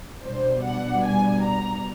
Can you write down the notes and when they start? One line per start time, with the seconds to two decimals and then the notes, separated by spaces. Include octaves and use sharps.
0.22 B2 G3 B3 D4 C5
0.63 F#5
1.04 G#5
1.43 A#5